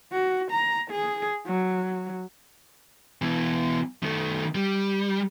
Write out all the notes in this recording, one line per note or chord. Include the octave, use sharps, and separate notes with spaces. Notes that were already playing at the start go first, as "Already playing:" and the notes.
F#4
A#5
G#4
F#3
B2 E3
D#3 A3
G3